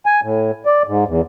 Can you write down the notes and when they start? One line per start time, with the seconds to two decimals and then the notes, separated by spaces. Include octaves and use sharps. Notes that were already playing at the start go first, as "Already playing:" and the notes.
0.06 G#5
0.23 A2
0.66 D5
0.87 G#2
1.08 E2